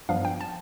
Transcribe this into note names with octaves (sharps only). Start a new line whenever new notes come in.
G2 F3 B3 D4 F5
G5
A5